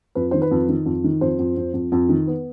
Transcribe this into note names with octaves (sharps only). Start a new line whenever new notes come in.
F2 B4
D#3 C5
B4
F2
D#3
F2
D#3
F2 C5
F2
F2
F2
F2
D#3
B3